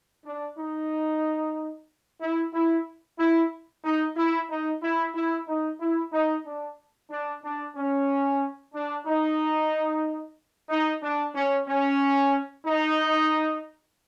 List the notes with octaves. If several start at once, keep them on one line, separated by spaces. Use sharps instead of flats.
D4
D#4
E4
E4
E4
D#4
E4
D#4
E4
E4
D#4
E4
D#4
D4
D4
D4
C#4
D4
D#4
D#4
D4
C#4
C#4
D#4